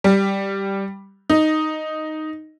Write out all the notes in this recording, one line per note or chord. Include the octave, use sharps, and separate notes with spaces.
G3
D#4